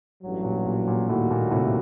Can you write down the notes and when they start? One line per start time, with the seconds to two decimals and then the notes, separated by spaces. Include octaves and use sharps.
0.23 A1 G2 F#3
0.45 A#2
0.66 A#2
0.88 A#2
1.09 D#2 A2 D#3 G3 A#3 F#4
1.31 A#2
1.51 A2 C3